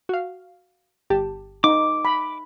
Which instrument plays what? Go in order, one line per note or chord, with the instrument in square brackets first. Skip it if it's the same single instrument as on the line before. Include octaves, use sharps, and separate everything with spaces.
[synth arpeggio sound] F#4 F5
G1 G4 A5
[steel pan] D#4 [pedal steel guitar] D6
[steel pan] B5